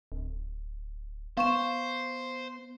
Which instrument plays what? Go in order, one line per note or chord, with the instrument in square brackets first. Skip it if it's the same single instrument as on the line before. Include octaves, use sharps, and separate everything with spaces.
[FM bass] D1
[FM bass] B3 [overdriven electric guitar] C5 [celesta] F5 C#6 E7